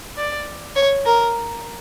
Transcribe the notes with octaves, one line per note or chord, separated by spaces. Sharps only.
D5
C#5
A#4